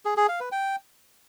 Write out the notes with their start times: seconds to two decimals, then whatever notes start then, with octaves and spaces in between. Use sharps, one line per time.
0.05 G#4
0.17 G#4
0.28 F5
0.40 B4
0.52 G5